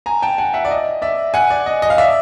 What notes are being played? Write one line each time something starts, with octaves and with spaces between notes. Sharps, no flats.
G#5 A#5
G5 A5
F#5 G#5
E5 F#5
D5
D#5
D5 E5
F#5 G#5
D5
D#5
D#5
F5
D5 E5